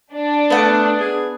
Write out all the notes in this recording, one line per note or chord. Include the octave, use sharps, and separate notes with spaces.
D4
A3 B3 B4 F#5
G#4